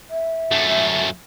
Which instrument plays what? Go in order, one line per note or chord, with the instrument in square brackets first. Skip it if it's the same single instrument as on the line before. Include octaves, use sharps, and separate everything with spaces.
[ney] E5
[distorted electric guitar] F#2 A3